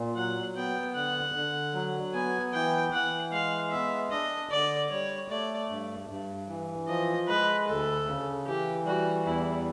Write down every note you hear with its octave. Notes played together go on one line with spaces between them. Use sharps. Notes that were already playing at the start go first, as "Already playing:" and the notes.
Already playing: A#2
F#3 F#5
B3 G5
D3 F#5
D3
F#3
B3 G#5
E3 G5
E3 F#5
G#3 F5
B3 E5
D4 D#5
D3 D5
G3 C#5
A3 D5
G2
G2
E3
F3 D#5
G#3 B4
D2 A4
C#3
E3 G4
G3 F#4
E2 E4